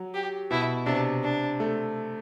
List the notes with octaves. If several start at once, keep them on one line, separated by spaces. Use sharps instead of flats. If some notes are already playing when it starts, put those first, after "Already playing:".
Already playing: F#3
G4
B2 E4
C3 D4
D4
A3